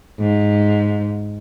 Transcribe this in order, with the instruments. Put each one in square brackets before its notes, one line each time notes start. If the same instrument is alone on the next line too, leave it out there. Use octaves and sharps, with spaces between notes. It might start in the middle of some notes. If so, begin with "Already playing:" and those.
[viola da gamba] G#2